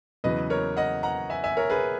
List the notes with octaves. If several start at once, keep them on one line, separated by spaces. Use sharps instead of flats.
E2 C#3 F#3 B4 D#5
A#4 C#5
D#5 F#5
F#5 A#5
E5 G#5
E5 G#5
A#4 C#5
G#4 B4